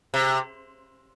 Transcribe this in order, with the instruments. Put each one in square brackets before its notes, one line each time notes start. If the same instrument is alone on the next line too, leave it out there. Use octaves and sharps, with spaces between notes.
[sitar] C3